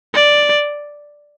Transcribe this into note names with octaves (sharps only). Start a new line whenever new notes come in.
D5